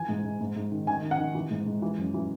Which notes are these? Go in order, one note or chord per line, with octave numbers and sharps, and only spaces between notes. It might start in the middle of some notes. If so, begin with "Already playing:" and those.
Already playing: E3 G#5
G#2
G#2
G#2
G#2
D#3
D#3 G#5
D#3
F#5
D#3
E3
G#2
G#2
E3
F#2
E3